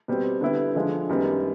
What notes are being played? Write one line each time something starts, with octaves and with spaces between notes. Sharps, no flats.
B2 G3 C4
D3 G3 B3 E4
D3 F3 G#3
F#2 D#3 G3 B3